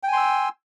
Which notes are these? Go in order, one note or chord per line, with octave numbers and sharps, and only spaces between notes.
G5 G#5 C6 E6